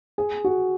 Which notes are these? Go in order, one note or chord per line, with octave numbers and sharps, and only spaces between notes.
G#4
F#4